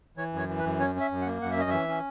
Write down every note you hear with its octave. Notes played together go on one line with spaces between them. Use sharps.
E3 C#5
F#2 C#5
E3
B4
F#2
C#4 C#5
C#4
E5
F#2
F#5
A#3
F#2 F#5
E5
C#4 D#5
E3 E5
C#4